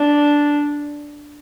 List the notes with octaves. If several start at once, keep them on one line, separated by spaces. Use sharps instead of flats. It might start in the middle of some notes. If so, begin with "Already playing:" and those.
Already playing: D4